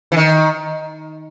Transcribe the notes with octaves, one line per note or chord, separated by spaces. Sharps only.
E3
D#3